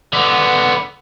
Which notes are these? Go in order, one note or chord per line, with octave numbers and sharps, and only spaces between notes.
D3 B3